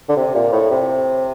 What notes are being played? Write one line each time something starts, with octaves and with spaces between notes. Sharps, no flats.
D3
C3
A#2
A2
C3